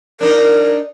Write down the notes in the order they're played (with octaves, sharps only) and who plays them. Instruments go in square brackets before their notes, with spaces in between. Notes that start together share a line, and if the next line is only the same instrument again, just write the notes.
[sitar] D4 D#4 [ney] A#4